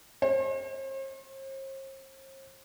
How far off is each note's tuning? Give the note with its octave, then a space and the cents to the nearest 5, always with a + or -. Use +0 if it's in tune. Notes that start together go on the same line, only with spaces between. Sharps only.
C5 +45